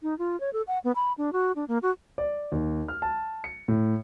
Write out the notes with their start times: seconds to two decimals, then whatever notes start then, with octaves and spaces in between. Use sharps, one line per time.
0.03 D#4
0.19 F4
0.40 C#5
0.53 A4
0.67 F#5
0.84 B3
0.95 B5
1.18 D4
1.33 F#4
1.56 D4
1.68 A#3
1.83 F#4
2.18 D5
2.52 D#2
2.88 F6
3.02 A5
3.44 C#7
3.68 A2